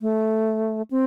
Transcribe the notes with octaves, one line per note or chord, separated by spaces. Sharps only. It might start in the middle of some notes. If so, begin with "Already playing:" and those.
A3
C4